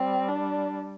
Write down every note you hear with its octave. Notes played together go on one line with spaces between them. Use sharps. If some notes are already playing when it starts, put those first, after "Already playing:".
Already playing: G3 C4
D4